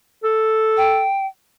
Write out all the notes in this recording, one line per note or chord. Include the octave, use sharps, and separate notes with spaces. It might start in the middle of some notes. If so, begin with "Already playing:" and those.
A4
G5